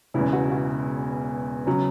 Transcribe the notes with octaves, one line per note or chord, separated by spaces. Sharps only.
E1 E2 C#3 E4
F#4
F#4
C#3 F#3